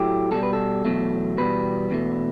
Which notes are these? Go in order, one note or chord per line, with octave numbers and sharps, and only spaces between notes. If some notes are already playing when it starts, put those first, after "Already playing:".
Already playing: A2 F#3 A3 G4
B2 G3 A4
B4
A4
E2 B2 F#3 A3
E2 B2 G3 B4
E2 B2 A3